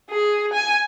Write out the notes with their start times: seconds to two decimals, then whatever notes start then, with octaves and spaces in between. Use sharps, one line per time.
0.10 G#4
0.53 G#5